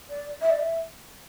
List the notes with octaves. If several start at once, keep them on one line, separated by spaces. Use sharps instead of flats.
D5
E5
D5
E5